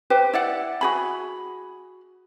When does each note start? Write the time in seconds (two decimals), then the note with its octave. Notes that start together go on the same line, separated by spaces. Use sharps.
0.10 G4 B4 C5
0.33 E4 D5 F#5
0.81 F#4 G#4 B5